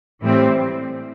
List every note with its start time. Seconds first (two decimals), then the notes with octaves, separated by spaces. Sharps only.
0.21 A2 E3 G3 C4